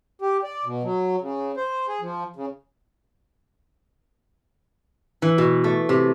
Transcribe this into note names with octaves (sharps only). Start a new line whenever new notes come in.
G4
D5
B2
F#3
C#3
C5
G#4
F3
C#3
E3
B2
A3
C3